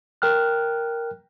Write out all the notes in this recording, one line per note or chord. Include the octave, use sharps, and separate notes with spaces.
A#4 G5 F6 F#6